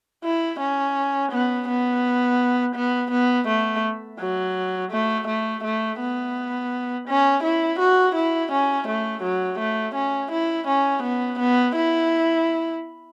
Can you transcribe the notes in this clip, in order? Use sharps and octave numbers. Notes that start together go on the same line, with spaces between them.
E4
C#4
B3
B3
B3
B3
A3
F#3
A3
A3
A3
B3
C#4
E4
F#4
E4
C#4
A3
F#3
A3
C#4
E4
C#4
B3
B3
E4